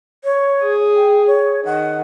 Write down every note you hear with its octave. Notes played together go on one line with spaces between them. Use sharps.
C#5
G#4
G5
C#5
D#3 F#5